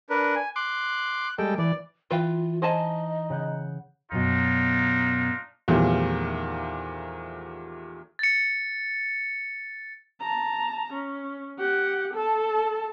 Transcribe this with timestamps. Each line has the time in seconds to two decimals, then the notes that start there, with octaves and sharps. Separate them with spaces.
0.10 D4 A#4 B4
0.36 G#5
0.56 C6 D6 F#6
1.38 G3 G#3 A4 G5
1.58 E3 D5
2.11 E3 F4 B4 F5 G5
2.62 D#4 C5 D#5 G#5 A5
3.30 C#3 F#5 G6
4.12 F#2 B2 D4 D#4 F4
5.68 E2 A#2 D#3 F3 G3 A3
8.19 A6 C#7
10.20 A5 A#5
10.93 C#4
11.58 G4 F#5
12.14 A4 A5